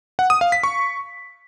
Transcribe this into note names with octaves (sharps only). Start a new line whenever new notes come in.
F#5
D#6
F5
B6
C#6